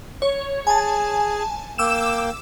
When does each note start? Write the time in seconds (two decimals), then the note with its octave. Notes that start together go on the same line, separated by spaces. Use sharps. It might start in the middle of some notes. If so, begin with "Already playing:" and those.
0.22 C#5
0.67 G#4 G#5 A5
1.78 A#3 G5 D6 E6 E7